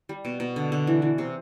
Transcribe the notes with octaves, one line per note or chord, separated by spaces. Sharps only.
G3
B2
B2
D3
D3
E3
E3
C3